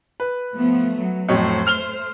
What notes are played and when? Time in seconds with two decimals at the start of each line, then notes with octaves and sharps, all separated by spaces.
0.20 B4
0.55 F3 A3 B3
0.96 F#3
1.29 F2 A2 F#3 A3 C5
1.67 F6 F7 G7